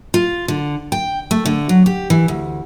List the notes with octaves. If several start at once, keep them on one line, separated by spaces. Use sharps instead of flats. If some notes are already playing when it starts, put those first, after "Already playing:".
F4
D3
G5
A3
D3
F#3
G4
E3
D2